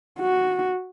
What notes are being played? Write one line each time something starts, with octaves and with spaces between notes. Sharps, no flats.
F#4